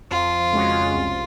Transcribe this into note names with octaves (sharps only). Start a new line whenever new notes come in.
F2 F4
C#3 G#3 C#4 F#4
C2